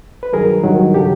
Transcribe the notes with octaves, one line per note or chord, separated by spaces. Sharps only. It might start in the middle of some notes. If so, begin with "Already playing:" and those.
B4
G2 D#3 F#3 G#4 A#4
G2 D#3 F#3
C#3 F#3 G4 A4